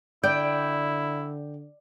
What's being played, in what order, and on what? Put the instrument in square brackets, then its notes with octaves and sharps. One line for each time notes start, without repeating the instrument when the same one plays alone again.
[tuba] D3 [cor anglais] E4 [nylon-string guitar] D5 [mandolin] G5